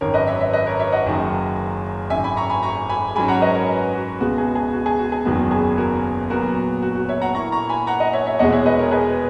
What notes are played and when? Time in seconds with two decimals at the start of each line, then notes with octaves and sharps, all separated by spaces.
0.01 G#1 F#2 D#3 A#4 C#5
0.14 B4 D#5
0.27 C#5 E5
0.41 C#5 E5
0.53 B4 D#5
0.66 A#4 C#5
0.79 C#5 E5
0.92 D#5 F#5
1.05 F#1 F#2 D#3 F#3
2.10 G#1 F#2 D#3 E5 G#5
2.24 G#5 B5
2.37 A#5 C#6
2.50 G#5 B5
2.63 A#5 C#6
2.89 G#5 B5
3.15 G#2 F#3 C#4 G#5 B5
3.28 F#5 A#5
3.42 B4 D#5
3.55 A#4 C#5
3.94 F#4
4.20 C#2 B2 G#3 B3 F#4
4.38 G#4
4.55 G#4
4.73 F#4
4.86 G#4
4.99 F#4
5.12 G#4
5.25 F#1 E2 D#3 F#3 B3 F#4
5.51 G#4
5.78 F#4 A#4
6.30 A#2 F#3 B3 F#4 A#4
6.82 F#4
6.95 F#4
7.09 C#5 E5
7.21 F#5 A#5
7.35 A#2 A#3 E4 A#5 C#6
7.52 A#5 C#6
7.69 G#5 B5
7.87 F#5 A#5
8.00 D#5 F#5
8.13 C#5 E5
8.26 C#5 E5
8.39 E2 B2 G#3 D#5 F#5
8.52 C#5 E5
8.66 B4 D#5
8.79 A#4 C#5
8.91 G#4 B4